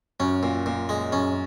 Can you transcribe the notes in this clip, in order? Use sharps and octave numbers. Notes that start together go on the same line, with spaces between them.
F#2 C#4
A#2
A#2
G#3
F#2 C#4